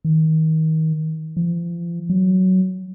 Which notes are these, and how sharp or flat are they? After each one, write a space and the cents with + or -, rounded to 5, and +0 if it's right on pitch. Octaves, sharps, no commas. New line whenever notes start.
D#3 +30
F3 -35
F#3 +10